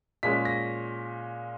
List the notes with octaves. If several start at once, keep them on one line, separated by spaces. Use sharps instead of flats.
A#2 G#3 C#4 B6
A#6